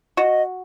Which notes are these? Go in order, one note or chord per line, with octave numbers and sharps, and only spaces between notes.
F#4 D#5